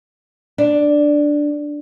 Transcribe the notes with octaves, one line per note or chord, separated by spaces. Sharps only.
D4